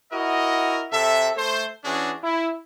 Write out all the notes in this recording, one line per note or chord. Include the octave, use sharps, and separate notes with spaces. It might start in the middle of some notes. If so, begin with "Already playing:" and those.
E4 F#4 A#4 D#5
C3 A4 E5
A3 C5
E3 C#4 D4 F#4 G#4
E4